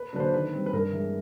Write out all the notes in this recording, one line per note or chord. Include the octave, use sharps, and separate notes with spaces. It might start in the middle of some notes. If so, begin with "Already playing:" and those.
Already playing: B4
D3 F#3 A#3 D4 B4
C5
D#3 B4
G3 C4
B4
G2 A#4
E3 G#3